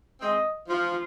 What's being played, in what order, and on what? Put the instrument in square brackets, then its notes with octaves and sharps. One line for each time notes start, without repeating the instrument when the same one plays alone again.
[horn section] G#3 C4 [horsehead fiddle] D#5
[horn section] F3 [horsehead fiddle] F4